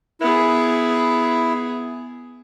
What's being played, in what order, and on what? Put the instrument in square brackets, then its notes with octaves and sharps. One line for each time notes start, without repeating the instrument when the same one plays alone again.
[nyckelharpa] B3 G#4 [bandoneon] E4